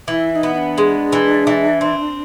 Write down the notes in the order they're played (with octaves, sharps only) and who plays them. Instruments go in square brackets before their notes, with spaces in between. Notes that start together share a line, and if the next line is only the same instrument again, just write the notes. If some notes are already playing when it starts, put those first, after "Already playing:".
[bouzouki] E3 [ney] E4
[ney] E4
D#4
[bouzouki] B3
[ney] D#4
D4
[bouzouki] G#3
E3
E3
C4